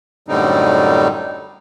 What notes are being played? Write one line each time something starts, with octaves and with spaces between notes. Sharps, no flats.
F#2 A2 D3 G3 C4 D#4